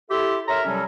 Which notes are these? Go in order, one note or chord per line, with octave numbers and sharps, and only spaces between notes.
E4 G4 A4 E5 C6
A#4 C#5 E5 A#5 C6
C3 F#3 G3 C#4 A4